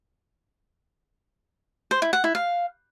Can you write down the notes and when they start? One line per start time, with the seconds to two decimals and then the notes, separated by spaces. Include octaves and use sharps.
1.91 C5
2.02 E4
2.13 F#5
2.24 E4
2.35 F5